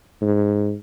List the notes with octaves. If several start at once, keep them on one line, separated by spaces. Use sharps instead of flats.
G#2